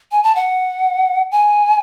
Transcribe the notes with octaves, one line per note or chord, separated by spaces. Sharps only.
G#5
A5
F#5
G#5